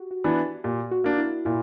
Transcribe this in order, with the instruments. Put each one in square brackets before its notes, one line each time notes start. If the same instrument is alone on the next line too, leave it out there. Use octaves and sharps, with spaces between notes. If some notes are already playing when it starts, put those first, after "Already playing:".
Already playing: [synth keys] F#4 G4
F#4
[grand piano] E3 B3 D4
[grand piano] A#2 [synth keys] G4
[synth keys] F#4
[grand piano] A#3 D4
[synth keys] E4
[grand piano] A#2 [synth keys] E4